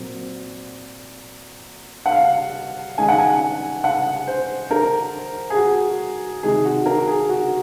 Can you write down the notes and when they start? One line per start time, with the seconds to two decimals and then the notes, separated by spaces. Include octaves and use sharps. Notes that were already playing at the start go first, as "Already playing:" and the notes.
Already playing: A#2 F#3 C4
2.06 F#5
2.12 F5
2.98 D#3 G#3 C#4 G#5
3.08 F#5
3.18 G#5
3.84 F#5
4.27 C5
4.71 A#4
5.50 G#4
5.56 F#4
6.43 C3 D#3 G#3 G#4
6.65 F#4
6.86 A#4
7.07 G#4
7.29 F#4